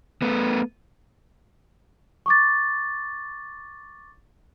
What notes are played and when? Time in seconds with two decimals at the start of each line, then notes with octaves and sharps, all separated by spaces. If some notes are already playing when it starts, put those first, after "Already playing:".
0.22 A3 B3
2.26 C#6 D6 A6